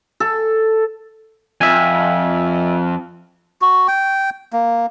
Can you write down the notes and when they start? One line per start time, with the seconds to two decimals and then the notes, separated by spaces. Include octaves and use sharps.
0.20 A4
1.61 F2 E5 G#5
3.62 F#4
3.88 G5
4.53 A#3